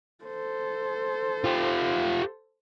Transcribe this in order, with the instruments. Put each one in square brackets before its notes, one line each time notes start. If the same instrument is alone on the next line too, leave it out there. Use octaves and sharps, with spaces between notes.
[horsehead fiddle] A4 C5
[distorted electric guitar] F4 G4